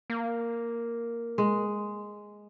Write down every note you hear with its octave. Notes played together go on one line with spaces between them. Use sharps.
A#3
G#3